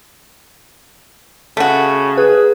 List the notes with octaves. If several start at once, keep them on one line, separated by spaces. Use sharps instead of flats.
C#3 A3 F#4
G#4 B4